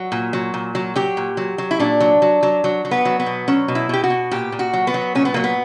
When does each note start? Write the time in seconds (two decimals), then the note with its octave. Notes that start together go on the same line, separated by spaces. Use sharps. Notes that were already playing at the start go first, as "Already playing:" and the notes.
Already playing: F#3 F#4
0.12 A#2
0.33 F#3
0.54 A#2
0.75 F#3
0.96 F#3 G4
1.17 A#2
1.37 F#3
1.58 F#3
1.71 E4
1.79 A#2 D4
2.01 F#3
2.22 F#3
2.43 F#3
2.64 F#3
2.85 F#3
2.91 B3
3.05 F#3
3.20 B3
3.26 B2
3.48 F#3 C#4
3.68 B2
3.75 E4
3.89 B2 G4
4.04 F#4
4.10 B2
4.31 A#2 G4
4.52 A#2
4.59 F#4
4.73 F#3
4.87 B3
4.94 F#3
5.15 A#2 C#4
5.25 B3
5.34 F#3 A#3
5.44 B3